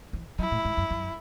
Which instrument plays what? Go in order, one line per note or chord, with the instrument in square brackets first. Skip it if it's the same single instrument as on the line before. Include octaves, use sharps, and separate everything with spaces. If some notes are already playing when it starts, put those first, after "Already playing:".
[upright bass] E3
[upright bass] F#3 [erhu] E4
[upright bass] A2
G#2
F#2
F#2